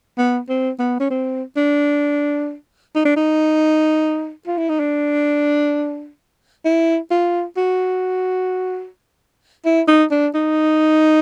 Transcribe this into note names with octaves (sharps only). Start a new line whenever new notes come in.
B3
C4
B3
C#4
C4
D4
D#4
D4
D#4
F4
E4
D#4
D4
E4
F4
F#4
E4
D#4
D4
D#4